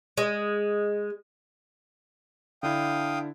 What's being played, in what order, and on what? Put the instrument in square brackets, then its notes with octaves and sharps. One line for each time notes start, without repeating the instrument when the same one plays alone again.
[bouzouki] G#3
[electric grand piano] D3 D4 E4 [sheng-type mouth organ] F5 G5 D#6